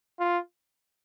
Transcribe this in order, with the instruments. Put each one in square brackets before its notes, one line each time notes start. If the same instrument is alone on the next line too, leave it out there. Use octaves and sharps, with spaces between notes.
[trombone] F4